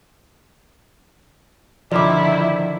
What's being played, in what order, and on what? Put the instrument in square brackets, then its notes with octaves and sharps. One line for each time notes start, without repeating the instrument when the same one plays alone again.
[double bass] D3 D#3 [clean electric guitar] F3 [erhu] E4 [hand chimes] D5 D6